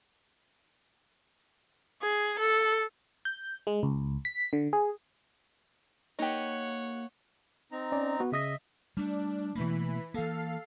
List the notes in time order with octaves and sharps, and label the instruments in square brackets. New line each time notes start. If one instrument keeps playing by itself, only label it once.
[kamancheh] G#4
A4
[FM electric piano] G6
G#3
C#2
B6
D3
G#4
[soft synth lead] A#3 [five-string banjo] D#4 G4 [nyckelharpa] C#5 F#5
[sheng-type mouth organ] C4 D#4 A#5
[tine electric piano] C#4 D5
B3 F#4
[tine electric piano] C#3 D#6 A#6 [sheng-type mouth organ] D#5 E5
[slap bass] G3 A3 [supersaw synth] D4
[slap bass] B2 A3 A#3 [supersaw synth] E3 B5
[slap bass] E3 A#3 [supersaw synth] A4 F5 C7